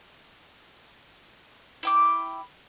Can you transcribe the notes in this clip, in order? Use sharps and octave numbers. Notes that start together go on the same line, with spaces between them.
E4 G5 D6